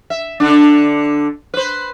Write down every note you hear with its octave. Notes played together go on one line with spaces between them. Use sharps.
E5
D3 D4
B4 C5